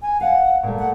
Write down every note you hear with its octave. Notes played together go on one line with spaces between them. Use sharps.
G#5
F5 F#5
A#2 A3
F#5